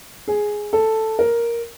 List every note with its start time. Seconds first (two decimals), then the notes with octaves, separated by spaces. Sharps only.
0.28 G#4
0.73 A4
1.19 A#4